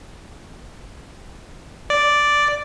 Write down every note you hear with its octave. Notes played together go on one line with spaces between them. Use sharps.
D5